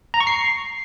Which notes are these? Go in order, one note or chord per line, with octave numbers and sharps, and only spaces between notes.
A#5
C#6
C7